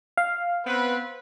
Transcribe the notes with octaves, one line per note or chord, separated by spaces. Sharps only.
F5
B3 C4 B4